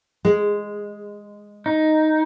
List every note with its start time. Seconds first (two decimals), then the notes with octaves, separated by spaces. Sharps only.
0.25 G#3
1.66 D#4